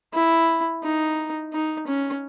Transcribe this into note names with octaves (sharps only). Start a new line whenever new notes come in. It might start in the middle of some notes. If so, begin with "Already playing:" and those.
E4
D#4
D#4
C#4